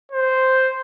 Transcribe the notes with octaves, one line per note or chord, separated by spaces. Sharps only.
C5